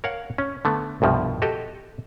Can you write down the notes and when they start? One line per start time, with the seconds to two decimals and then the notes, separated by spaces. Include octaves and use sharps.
0.04 A#4 C#5 F5 F#5
0.38 C#4
0.65 D3 A3 B3
1.02 C2 G2 B2 F3
1.42 F#4 G4 A4 D#5